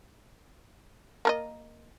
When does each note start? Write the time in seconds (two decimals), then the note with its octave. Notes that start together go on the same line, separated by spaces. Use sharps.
1.25 A#3 A#4 D#5